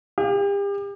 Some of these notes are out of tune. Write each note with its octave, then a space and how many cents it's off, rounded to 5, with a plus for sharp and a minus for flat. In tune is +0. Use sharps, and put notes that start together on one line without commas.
G4 +40